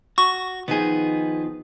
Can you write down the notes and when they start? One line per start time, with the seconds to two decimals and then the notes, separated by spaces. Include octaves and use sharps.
0.18 F#4 C#6
0.68 D#3 F3 B3 D#4 G#4